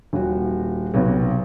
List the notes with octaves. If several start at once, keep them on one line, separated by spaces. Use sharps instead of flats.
D#1 F#4
B1 C3 B3